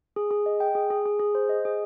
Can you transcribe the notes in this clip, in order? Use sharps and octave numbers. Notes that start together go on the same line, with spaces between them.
G#4
G#4
D#5
G5
G#4
G#4
G#4
G#4
C5
D#5
G#4